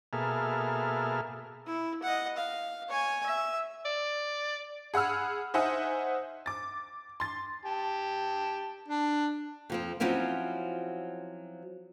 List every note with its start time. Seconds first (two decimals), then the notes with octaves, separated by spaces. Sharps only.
0.13 B2 A#3 G#4 A4 E5 F6
1.67 E4
2.03 D#5 F#5
2.37 F5
2.89 C#5 G#5
3.27 E5
3.85 D5
4.94 G#4 F#5 B5 E6 F6
5.54 D#4 C5 E5 F#5 G#5
6.46 D6 A6
7.20 C6 A6
7.65 G4 A5
8.88 D4
9.70 F2 F3 C4
10.00 F3 F#3 C4 C#4 E4